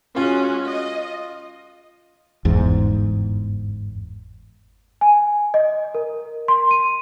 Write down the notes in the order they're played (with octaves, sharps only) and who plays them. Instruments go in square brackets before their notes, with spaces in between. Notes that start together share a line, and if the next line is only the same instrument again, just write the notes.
[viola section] G#3 C#4 F#4 [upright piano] F4
[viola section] D#5
[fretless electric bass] G1 E2 G#2
[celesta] G#5
D#5
A#4
C6
D#7